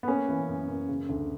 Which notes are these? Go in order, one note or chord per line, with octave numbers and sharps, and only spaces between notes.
B3
A#3 C#4
E3
F#2
F#2
C#3
D2